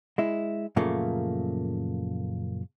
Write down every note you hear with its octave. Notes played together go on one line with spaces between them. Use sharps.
G#3 E4
F#2 A#2 C#3 F3 A3 A#3